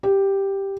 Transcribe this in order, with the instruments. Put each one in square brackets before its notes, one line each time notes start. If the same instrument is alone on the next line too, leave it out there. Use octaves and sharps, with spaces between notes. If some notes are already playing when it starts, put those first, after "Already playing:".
[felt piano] G4